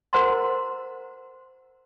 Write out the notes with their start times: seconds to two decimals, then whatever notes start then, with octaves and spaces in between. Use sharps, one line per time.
0.13 F#4 A#4 C5 F#5 A#5 C6